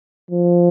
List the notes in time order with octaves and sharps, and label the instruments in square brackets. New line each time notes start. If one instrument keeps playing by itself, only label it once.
[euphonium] F3